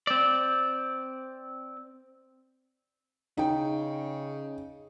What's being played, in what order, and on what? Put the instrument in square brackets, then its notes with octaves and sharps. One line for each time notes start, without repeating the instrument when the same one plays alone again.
[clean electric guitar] C4 D5
[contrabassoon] C#3 [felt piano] D#4 G5